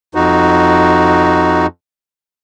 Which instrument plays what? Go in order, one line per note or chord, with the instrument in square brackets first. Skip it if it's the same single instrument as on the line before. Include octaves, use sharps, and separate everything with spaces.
[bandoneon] F2 D#4 F#4